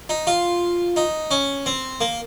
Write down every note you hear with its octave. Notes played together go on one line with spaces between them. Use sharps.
D#4
F4
D#4
C#4
C4
A#3